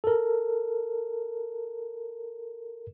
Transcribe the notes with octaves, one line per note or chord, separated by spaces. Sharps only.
A4 A#4